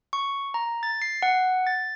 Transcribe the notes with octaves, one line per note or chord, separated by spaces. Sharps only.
C#6
A#5
A6
C7
F#5
A6